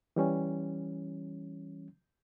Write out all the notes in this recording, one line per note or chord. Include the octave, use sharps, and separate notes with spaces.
E3 G3 C#4